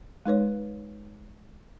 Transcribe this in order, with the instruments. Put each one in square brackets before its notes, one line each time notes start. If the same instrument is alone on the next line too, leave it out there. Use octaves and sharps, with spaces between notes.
[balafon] G#3 D#4 B4 C#5